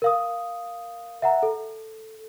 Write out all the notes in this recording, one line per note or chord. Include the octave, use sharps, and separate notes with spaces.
A#4 F5 D#6
E5 F#5 A#5
A4